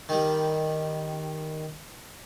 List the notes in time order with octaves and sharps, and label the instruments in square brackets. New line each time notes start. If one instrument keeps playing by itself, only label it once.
[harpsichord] D#3 G3